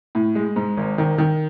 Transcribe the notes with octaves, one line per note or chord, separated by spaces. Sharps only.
A2
G#3
G#2
G#1
D#3
D#3